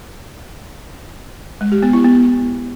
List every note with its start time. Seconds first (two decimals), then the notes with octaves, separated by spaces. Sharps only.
1.61 G#3
1.72 G4
1.83 B3
1.93 E4
2.04 B3